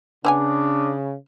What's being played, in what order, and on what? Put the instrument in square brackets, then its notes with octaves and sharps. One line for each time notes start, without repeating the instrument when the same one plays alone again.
[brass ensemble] C#3 [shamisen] B3 C#4 G#5 [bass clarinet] D4